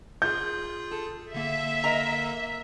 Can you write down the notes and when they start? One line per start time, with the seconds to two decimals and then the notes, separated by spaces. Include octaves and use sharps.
0.22 F4 G#4 G6
0.91 A4
1.34 D3 A#3 E5
1.84 A#4 D#5 A#5